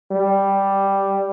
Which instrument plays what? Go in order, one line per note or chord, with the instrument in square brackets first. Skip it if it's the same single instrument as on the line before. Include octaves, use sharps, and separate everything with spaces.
[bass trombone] G3